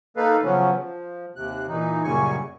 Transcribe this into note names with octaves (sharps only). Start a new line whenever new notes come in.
A#3 D#4 A4 B4 F5
C#3 F3 F#3 B3 C#4
F3
D#2 C3 F#6
A#2 E3 D#4
F#2 A#2 C#3 G3 G#5 C#6